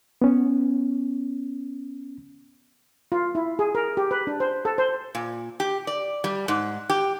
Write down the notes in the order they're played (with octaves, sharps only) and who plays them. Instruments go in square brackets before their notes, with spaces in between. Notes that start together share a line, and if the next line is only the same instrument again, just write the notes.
[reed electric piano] B3 C#4
[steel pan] F4
E4
G#4
A#4
G4
B4
D4
C5
A4
C5
[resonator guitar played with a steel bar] A#2
G4
D5
G3
G#2
G4